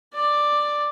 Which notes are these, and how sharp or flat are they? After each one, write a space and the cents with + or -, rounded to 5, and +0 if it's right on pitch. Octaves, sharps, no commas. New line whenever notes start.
D5 +5